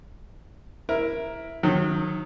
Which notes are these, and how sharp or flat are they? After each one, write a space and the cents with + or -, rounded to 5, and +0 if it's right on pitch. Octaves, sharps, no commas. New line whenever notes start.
E4 +0 A#4 +10
D#3 -10 F#3 -30